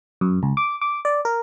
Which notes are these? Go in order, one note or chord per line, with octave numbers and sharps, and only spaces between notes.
F#2
C#2
D6
D6
D5
A#4